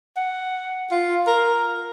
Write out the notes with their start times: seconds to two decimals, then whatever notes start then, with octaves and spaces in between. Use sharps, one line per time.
0.16 F#5
0.91 F4
1.27 A#4